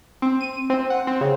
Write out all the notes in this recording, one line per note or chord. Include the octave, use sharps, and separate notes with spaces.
C4
D#7
C4
F#5
C4
C#3